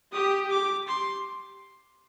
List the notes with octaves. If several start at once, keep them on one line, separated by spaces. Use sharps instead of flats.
G4 D#6
D6
C6